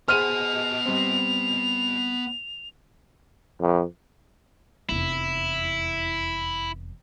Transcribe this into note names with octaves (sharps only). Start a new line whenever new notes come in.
B3 G#4 C5 D#5 F6 D#7 F7
G3 C4
F2
F1 E2 E4